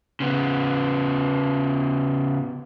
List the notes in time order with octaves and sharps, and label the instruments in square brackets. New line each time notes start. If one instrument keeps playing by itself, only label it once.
[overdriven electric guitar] C#3 B3